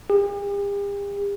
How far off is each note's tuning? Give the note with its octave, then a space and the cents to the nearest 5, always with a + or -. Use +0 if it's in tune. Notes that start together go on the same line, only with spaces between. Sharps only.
G4 +45